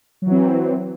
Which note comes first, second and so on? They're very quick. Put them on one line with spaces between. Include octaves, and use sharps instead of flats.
F#3 E3 C4